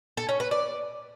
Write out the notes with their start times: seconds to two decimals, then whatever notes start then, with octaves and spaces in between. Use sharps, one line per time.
0.17 A4
0.29 C#4
0.40 B4
0.51 D5